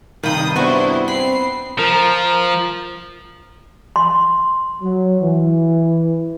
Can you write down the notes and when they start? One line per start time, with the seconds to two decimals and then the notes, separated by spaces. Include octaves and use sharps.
0.23 G2 C3 D#3 D#4 G5 B5 D#6
0.56 B3 D4 E4 F#4 C5 C#6
1.08 C4 B5 C7
1.79 F3 A#4
3.96 C6
4.81 F#3
5.20 E3